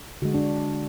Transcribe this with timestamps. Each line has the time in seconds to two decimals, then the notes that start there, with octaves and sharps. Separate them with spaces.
0.22 D3 G#3 F#4
0.34 D4